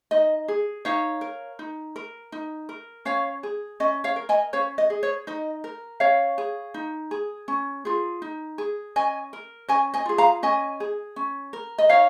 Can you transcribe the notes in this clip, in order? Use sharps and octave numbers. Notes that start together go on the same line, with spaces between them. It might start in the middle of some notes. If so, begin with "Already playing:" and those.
D#4 D#5
G#4
D#4 C#5 F5
A#4
D#4
A#4
D#4
A#4
C#4 C#5 F5
G#4
C#4 D#5
C#5 F5
A#4
D#5 G#5
C#4 C#5 F5
D#5
G#4
C#5
D#4 D#5
A#4
C#4 C#5 F5
G#4
D#4
G#4
C#4
F4 G#4
D#4
G#4
C#4 D#5 G#5
A#4
C#4 D#5 G#5
D#5 G#5
F4 G#4
F5 A#5
C#4 D#5 G#5
G#4
C#4
A#4
D#5
D#4 C#5 F5